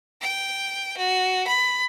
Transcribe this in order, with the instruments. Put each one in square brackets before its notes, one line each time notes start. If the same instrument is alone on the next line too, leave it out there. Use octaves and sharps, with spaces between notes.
[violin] G5
F#4
B5